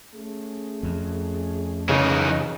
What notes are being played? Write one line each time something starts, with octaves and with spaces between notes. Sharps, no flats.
A3 C#4 G#4
F2
C#3 E3 D#4